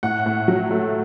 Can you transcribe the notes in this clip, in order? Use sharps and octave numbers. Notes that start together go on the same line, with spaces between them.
A2 F#5
A2
F#3
A3